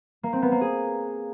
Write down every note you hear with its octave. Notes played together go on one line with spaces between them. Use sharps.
A#3
C4
B3
A#3
G#4